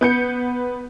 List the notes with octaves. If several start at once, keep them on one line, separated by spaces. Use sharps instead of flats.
B3 G6 C#7